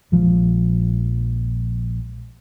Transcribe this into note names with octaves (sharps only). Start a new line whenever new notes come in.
A#1 F3 G#3